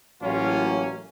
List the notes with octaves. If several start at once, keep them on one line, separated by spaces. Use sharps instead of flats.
A1 A2 F#3 A#3 C#4 F4